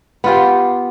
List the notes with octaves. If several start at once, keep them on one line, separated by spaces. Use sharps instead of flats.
B3 F4 G4